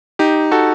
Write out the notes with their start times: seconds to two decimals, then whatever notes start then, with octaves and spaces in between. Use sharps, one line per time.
0.19 D#4 G4
0.51 F#4 A4